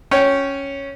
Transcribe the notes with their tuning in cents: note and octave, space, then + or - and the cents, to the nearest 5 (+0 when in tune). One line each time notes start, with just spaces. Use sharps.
C#4 +0 C#5 +0 G5 -15